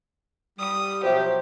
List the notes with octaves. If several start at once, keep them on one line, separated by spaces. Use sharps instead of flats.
G3 D#6
B2 F3 F#3 G4 C5 E5